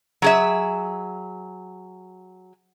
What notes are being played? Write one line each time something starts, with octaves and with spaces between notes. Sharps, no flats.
F#3 G#4 E5